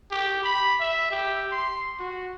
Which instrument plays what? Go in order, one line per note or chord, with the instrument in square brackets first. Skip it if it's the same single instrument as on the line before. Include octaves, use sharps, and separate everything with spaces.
[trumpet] G4
B5
E5
G4
C6
F#4